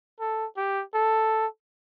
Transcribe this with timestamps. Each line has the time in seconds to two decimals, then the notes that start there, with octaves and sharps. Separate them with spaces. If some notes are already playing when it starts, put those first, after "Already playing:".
0.20 A4
0.57 G4
0.94 A4